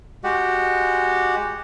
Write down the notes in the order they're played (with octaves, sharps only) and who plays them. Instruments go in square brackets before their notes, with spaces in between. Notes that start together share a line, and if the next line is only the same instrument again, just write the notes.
[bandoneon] G#3 F#4 G4